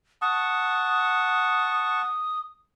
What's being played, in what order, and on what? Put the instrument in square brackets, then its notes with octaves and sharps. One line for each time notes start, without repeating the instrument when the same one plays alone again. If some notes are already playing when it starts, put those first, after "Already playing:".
[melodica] F#5 A5 C#6 [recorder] D#6